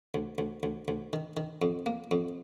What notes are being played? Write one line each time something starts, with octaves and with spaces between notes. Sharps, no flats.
D2
D2
D2
D2
D#3
D#3
F2
A#3
F2